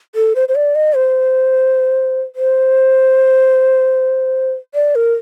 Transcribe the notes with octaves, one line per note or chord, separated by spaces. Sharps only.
A4
C5
C5
D5
D#5
C5
C5
D5
A#4